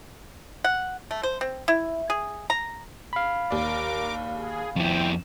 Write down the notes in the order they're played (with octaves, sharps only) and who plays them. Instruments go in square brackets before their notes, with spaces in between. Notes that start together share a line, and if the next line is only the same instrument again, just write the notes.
[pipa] F#5
A3
C5
C4
E4
G#4
A#5
[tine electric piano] F5 B5
[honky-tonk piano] D#2 D5 [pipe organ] A#4 D6
[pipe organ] G#4
[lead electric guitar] F2 E4 [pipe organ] C4 G5